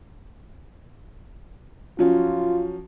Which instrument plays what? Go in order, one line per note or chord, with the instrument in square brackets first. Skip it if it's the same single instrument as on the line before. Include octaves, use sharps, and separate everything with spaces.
[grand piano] F3 F#3 C#4 [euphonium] F4